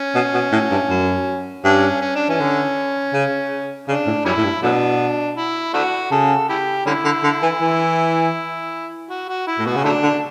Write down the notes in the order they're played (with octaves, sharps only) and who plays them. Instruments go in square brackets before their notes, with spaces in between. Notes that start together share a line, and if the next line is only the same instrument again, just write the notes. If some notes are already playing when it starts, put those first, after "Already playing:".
Already playing: [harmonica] C#4
[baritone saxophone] B2
B2
A2
G2
F#2
[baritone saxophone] G2 [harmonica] C#4
[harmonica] C#4
D4
[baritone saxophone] E3 [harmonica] C#4
[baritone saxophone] D3
C#3
[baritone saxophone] C#3 [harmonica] D4
[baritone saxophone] A2
[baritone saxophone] F#2 [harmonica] G3 C#4 E4
[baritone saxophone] A2
G2
[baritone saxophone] B2 [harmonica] F#3 A3 D4
[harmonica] E4
A3 D4 F#4
[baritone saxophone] C#3 [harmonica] A4
[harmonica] E4 G4
[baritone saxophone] D3 [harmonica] G3 C#4 E4
[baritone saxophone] D3
D3
E3
E3
[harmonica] F#4
F#4
E4
[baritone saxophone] A2
[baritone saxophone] B2 [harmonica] F#4
[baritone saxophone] C#3
[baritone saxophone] D3 [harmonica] F#3 A3 D4
[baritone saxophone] D3